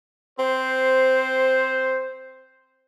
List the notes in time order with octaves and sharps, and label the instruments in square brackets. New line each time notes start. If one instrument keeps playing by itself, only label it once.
[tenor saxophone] C4 [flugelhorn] C5